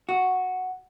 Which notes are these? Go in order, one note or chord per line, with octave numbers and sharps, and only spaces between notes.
F#4